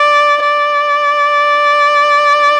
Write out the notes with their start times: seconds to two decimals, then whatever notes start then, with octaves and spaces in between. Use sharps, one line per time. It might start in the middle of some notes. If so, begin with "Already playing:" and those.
Already playing: D5
0.43 D5